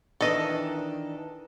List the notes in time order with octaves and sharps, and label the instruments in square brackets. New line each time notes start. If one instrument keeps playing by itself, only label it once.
[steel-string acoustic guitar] D#3 E3 D4 [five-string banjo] A4 D#5